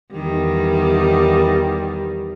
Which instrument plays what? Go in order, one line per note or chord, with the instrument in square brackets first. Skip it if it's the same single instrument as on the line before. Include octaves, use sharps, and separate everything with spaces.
[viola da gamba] E2 D#3 G3